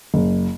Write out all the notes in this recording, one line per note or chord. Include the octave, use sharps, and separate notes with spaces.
F#1